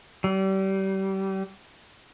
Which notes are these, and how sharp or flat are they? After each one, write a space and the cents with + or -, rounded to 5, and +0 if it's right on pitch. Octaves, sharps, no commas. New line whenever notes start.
G3 -30